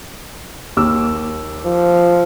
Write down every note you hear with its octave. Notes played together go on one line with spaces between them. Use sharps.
D#2 D6 E6
F3